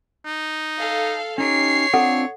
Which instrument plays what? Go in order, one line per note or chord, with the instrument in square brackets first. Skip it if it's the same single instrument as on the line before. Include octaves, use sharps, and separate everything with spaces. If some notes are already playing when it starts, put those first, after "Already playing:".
[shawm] D#4
[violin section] A4 F5
[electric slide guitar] C#4 D#4 G4 [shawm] C#5 [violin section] C7
[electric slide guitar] C4 D4 F4 [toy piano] A4 F#5